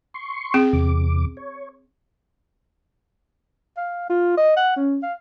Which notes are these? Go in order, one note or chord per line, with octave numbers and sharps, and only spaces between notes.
C6 C#6
C4 G#4
E2 C3 D6
C#5
F5
F4
D#5
F#5
C#4
F5